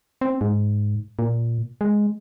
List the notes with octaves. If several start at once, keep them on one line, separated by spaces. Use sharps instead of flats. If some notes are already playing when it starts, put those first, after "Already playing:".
C4
G#2
A#2
G#3